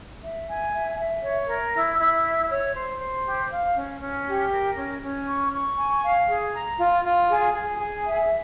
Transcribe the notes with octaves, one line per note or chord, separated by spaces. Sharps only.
E5
G#5
E5
E5
C#5
A#4
E4
E4
E5
C#5
C5
C5
G4
F5
C#4
C#4
G4
A#4
C#4
C#4
C#6
C#6
G#5
F5
G#4
A#5
F4
F4
G#4
G#4
G#4
E5